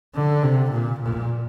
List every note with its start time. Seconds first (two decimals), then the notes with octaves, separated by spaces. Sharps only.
0.15 D3
0.43 C3
0.72 A#2
1.00 A#2